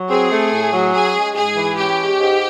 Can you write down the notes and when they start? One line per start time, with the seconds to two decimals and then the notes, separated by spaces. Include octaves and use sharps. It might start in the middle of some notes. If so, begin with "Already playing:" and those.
Already playing: F#3
0.10 C4 G#4
0.31 A3
0.52 A2
0.73 F#3
0.93 C#4 G#4
1.14 G#3
1.35 G#2 G#4
1.56 E3
1.77 C#4 G4
1.98 G#3
2.19 G#2